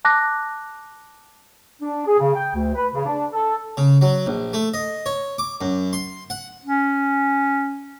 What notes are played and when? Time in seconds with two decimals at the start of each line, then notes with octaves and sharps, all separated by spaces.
0.05 A5 D6 F#6 A#6
1.82 D4
2.07 G#4
2.19 C#3
2.35 G5
2.54 D2
2.75 B4
2.94 C#3
3.06 D4
3.33 A4
3.77 C#3
4.01 F#3
4.26 A#1
4.53 A3
4.74 D#5
5.06 C#5
5.38 D6
5.61 F#2
5.93 C6
6.30 F#5
6.65 C#4